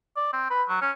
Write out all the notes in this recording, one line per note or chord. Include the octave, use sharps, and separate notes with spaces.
D5
C4
B4
F#3
C#4